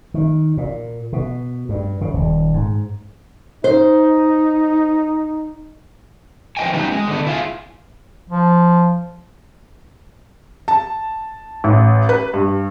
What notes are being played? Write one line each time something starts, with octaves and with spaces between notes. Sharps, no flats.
D#3
A#2
B2
G2
C#3
D#1
G#2
D#4 C5
E3 F3 G3 D#5 G5 G#5
G3 B3 C#4 D#4 E4 F#4
G#3
D3 B3
E4 F4 G#4
F3
A5
A1
B4
G2